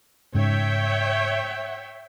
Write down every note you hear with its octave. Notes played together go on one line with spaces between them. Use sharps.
G#2 C#3 C#5 E5 G5